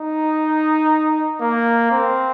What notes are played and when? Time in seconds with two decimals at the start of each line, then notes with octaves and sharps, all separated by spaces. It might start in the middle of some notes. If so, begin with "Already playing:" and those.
Already playing: D#4
1.41 A#3
1.91 C4